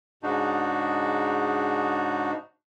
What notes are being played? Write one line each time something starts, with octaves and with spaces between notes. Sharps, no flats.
G#2 C#3 D4 D#4 F#4